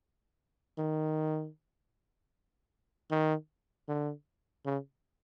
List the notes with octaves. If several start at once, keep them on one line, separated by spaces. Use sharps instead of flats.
D#3
D#3
D3
C#3